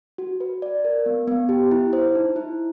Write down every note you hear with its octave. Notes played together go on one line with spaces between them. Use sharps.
F#4
B4
D5
A#4
B3
B3
G4
E4
C5
D#4
E4